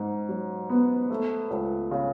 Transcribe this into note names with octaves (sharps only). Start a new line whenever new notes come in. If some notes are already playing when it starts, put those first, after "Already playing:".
Already playing: G#2
F#3
B3
A3
C#2
C#3